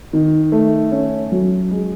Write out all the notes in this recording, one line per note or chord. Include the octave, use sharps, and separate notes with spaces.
D#3
A3
C#4
F#3
G#3